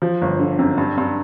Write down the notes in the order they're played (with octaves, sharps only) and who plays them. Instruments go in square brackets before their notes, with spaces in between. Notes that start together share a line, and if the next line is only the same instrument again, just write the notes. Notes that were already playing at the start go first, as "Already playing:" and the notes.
[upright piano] F3
G1
D3
F#2
G2
G2